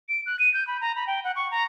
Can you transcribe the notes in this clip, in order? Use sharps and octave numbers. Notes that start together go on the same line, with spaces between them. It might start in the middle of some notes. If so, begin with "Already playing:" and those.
D7
F#6
D#7
G6
B5
A#5
B5
G5
F#5
C#6
A#5